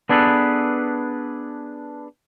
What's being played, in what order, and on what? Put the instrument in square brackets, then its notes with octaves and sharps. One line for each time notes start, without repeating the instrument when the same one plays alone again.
[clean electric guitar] B3 D4 G#4 A4 B4